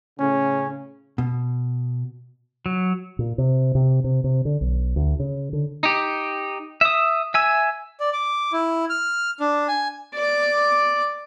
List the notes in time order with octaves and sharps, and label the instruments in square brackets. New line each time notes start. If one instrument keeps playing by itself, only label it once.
[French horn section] A2 C#3 [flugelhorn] C#4
[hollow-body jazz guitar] B2
[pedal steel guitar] F#3
[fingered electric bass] A#2
C3
C3
C3
C3
D3
B1
D2
C#3
D3
[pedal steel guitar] D#4 G4
E5 D#6
E5 G#5 E6
[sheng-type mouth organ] D5
D6
E4
F6
D4
G#5
[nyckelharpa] D5 D6